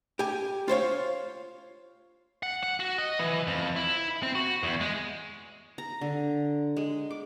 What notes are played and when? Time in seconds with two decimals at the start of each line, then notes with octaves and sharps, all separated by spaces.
0.19 G4 G#5
0.68 F4 C5 C#5 F5
2.43 F#5
2.63 F#5
2.80 F#4
2.98 D#5
3.19 E3
3.47 F2
3.76 E4
4.23 C4
4.35 F#4
4.63 E2
4.81 G#3
5.78 A#5
6.01 D3
6.77 G#3
7.11 D6